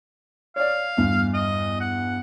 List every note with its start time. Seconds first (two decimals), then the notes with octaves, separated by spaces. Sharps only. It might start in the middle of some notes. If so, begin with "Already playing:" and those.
0.56 C#5 D5 F5
0.97 E2 G2
1.34 D#5
1.81 F#5